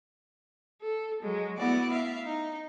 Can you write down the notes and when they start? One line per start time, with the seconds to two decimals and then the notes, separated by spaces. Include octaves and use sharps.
0.81 A4
1.22 F#3 G#3
1.57 A3 B3 E4 F#4 D5
1.92 E5 F5
2.25 D#4